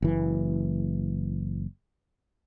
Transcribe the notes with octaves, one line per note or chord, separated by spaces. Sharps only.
F#1 E3